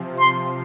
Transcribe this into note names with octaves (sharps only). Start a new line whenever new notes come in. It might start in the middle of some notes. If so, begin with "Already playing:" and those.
Already playing: C3 F3
C6